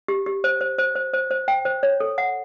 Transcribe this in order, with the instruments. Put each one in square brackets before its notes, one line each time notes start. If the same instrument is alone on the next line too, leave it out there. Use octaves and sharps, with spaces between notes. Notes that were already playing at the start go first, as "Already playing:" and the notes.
[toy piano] G4
G4
C5
C5
C5
C5
C5
C5
G5
C5
C#5
A4
F#5